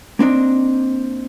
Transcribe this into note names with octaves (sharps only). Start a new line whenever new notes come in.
A#3 C4 D4 D#4